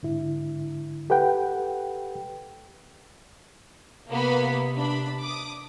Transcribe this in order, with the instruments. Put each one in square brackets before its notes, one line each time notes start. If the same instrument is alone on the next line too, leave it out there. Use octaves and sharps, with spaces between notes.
[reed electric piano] G#2 D3 E4
G4 A4 B4 F#5 G5
[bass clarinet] C3 [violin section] A#3 B3 B5
[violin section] D4 B5
D6 D#6